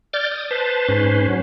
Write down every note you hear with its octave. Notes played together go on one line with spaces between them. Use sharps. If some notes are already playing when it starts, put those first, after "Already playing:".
D5 F6 G6 A6
D#6
B4 C5 A5
G#2 C#4 B4 C5
F#3 C#4